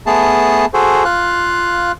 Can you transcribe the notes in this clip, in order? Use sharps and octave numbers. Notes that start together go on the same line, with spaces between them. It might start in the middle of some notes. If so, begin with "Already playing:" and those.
A3 B3 G#4 A5
F#4 G#4 A4 C5
F4 F5 F#6